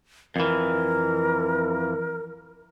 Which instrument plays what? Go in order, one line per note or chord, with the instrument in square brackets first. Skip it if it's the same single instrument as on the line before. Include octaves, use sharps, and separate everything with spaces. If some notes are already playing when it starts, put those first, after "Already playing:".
[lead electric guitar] F2 E3 [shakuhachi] A#4